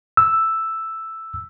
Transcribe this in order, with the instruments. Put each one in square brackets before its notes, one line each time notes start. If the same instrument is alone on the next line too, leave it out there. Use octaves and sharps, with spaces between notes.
[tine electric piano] E6